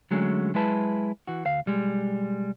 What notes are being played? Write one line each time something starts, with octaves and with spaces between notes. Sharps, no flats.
D3 F#3 G#3 A3 C#4
F#3 G#3 E4 B4 A5
E3 F#4
D2 F5
B1 G3 G#3